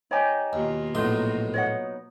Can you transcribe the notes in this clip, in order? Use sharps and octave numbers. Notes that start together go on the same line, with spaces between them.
D#4 G4 C#5 G#5
D#2 B2 A#3 F4
A#1 A2 F#3 B3 D#4 C6
C#5 D#5 F#5